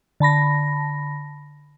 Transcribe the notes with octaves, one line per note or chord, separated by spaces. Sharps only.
D3 A5 B5 A#6